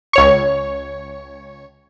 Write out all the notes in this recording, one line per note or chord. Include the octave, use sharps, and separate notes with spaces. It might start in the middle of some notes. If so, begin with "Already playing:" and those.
C#2 C#5 C#6